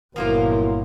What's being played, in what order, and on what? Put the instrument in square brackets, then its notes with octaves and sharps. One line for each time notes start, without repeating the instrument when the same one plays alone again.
[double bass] G1 A#2 [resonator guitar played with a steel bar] F3 A#3 F4 [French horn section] F#3 E4 A#4